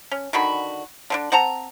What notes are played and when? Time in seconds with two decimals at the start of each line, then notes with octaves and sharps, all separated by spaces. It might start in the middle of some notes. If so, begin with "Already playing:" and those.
0.11 C#4
0.33 D3 D#3 F#4 B5
1.10 D3 C4 D4
1.32 C4 F#5 A5 A#5